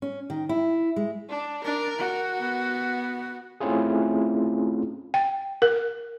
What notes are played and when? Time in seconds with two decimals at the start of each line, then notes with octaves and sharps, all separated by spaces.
0.02 C#4
0.30 D#3
0.49 E4
0.96 G#3
1.29 D4
1.64 D4 A#4
1.98 F#4
2.39 B3
3.61 A3 C4 C#4 E4 F4 G#4
5.14 G5
5.62 A#4